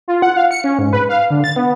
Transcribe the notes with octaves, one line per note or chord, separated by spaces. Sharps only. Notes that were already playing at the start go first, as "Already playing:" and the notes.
F4
F#5
F5
C#7
C#4
G#2
B4
F5
D3
A6
B3